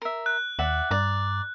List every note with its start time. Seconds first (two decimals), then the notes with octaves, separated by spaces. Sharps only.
0.02 A#4 E5
0.26 F#6
0.59 D#2 D5 E5 F#5
0.91 G2 D5 A#5